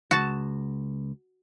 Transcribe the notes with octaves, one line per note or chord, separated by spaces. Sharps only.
C#2 F#4 A5